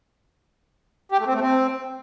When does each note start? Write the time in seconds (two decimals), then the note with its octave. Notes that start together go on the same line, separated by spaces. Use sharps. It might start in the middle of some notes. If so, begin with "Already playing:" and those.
1.12 G4
1.19 A3
1.27 C4
1.34 A3
1.41 C4